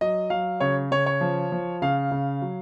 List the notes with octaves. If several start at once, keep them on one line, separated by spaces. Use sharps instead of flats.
F#3 D#5
F#3 F5
C#3 C#5
C#3 C#5
C#5
F3
F3
C#3 F5
C#3
F#3